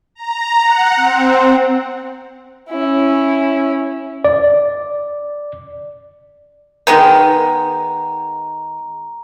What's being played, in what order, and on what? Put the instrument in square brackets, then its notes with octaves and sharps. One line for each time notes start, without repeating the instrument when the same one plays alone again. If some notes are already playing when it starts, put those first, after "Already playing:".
[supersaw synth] A#5
F#5
C4
[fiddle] C#4 E4
[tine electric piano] D5
[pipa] D#3 G#3 B3 [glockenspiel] A#5